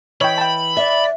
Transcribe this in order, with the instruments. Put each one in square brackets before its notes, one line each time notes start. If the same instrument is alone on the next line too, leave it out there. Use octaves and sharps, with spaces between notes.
[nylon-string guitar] E3 [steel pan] C#5 D#5 G5 [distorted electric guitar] B5
[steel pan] G5 A5
[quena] D5 [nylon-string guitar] E5